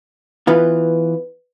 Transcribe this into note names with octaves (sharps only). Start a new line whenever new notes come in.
E3 B3 F4 B4